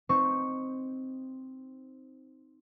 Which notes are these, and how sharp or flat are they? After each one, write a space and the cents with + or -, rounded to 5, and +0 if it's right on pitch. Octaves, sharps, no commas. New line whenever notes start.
C4 +0 D#4 +0 C#6 +0